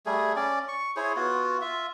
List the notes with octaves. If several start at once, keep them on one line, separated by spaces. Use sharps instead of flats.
G3 A3 G#4
C#4 D5
C#6
E4 G#4 C5 C#5
B3 F4 F#4
F4 E5